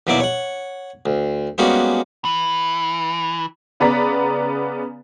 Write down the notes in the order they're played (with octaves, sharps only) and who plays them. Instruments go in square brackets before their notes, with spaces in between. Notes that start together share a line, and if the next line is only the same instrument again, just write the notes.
[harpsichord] D#2 B2 F#3 E4 D5 E5
C#5 F#5
D2
G3 G#3 A#3 B3 C#4 F#4
[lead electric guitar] E3
[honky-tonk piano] C#3 B3 B4 D5 A#5 B6